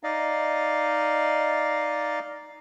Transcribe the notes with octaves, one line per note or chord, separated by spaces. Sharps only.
D#4 D5 D#5 F5